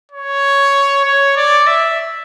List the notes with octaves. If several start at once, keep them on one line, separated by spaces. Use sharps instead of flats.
C#5
C#5
D5
E5